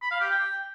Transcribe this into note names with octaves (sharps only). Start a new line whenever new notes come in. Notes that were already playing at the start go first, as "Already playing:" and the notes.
B5
F5
G4
G5